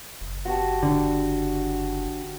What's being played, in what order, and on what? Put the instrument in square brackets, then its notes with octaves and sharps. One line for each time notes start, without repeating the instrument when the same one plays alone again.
[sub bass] F#1
[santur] F#4 G4 A5
[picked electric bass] D3